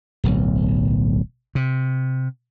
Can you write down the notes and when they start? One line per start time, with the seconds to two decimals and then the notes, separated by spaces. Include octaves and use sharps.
0.24 D1 B1
1.55 C3